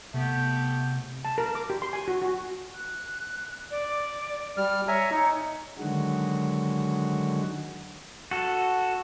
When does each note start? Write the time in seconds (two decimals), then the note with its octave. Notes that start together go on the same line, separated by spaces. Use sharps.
0.14 C3 A3 B3 G4
1.25 A5
1.38 A#4
1.55 D6
1.70 G4
1.82 C6
1.93 G#5
2.08 F#4
2.22 F#4
2.74 F#6
3.71 D5
4.57 G3 F6
4.88 C#5 E5 G#5 A#5
5.11 D#4
5.78 D3 D#3 F#3 G#3 F#4
8.31 F#4 A4